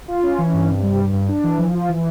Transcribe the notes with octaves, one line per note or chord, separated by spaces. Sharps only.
F4
C#4
E3
G2
C3
G3
G2
G2
D4
E3
F3
F4
E3